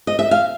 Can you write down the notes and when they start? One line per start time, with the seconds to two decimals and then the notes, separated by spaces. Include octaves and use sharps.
0.07 D#5
0.19 E5
0.31 F5